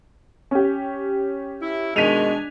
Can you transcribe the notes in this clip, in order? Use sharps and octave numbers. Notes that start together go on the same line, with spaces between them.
C#4 G4
E4
B2 D#3 G#3 D4 G#5 B6 D#7 F7